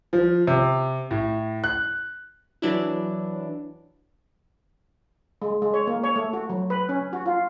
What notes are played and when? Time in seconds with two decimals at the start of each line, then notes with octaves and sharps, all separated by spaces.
0.13 F3
0.47 C3
1.11 A2
1.64 F#6
2.62 E3 F#3 D4 E4
5.42 G#3
5.62 G#3
5.74 C#5
5.87 A#3
6.04 C#5
6.16 A3
6.33 F#4
6.49 F#3
6.70 B4
6.89 C#4
7.13 F#4
7.26 F4